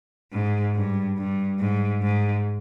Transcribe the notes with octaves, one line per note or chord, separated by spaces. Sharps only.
G#2
G2
G2
G#2
G#2